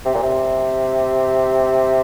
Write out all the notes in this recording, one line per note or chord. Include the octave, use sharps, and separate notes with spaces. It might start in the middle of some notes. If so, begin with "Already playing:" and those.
C3
A#2
C3